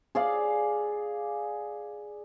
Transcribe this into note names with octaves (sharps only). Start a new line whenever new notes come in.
G#4 D5 F5